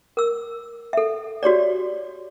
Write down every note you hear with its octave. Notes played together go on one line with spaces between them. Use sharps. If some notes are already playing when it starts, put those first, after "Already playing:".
A#4 E6
A4 E5
F#4 G4 C#5 D5